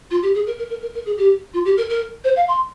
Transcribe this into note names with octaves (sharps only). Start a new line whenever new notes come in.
F4
G4
G#4
A#4
A#4
A#4
A#4
A#4
G#4
G4
F4
G4
A#4
A#4
C5
F5
C6